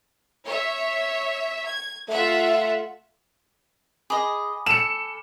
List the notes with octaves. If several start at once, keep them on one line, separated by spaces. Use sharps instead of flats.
C#5 E5
G#6
A3 F4 E5 F#5
G#4 D#5 G#5 B5 D6
A4 C#7 E7